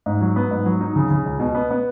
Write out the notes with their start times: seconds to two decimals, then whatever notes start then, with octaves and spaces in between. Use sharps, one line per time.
0.06 G#2
0.21 F#3
0.36 B3
0.51 G#2
0.66 F#3
0.81 D#4
0.96 C#3
1.10 C#3
1.26 C#2
1.40 B2
1.55 B3
1.71 B3